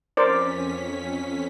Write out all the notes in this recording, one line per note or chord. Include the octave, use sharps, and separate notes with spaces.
F2 C#4 A#4 C5 D5 B6